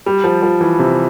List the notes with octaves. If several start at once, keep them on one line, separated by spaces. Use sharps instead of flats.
G3
F3
F3
E3
C3